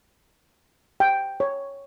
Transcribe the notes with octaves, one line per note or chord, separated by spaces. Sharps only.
G5
C#5